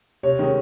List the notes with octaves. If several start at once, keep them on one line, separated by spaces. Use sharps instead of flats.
C3 C#5
D#3 G#3 C#4